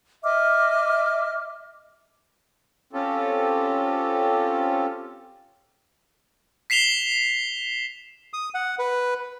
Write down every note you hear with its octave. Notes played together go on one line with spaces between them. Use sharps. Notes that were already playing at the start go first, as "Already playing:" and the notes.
D#5 E5 D6 F6
C4 C#4 F4 G4 A4
B6 C7 E7 F7 G7
D#6
F#5
B4